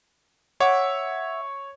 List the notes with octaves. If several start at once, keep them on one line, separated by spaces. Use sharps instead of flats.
C#5 E5 F#5 D6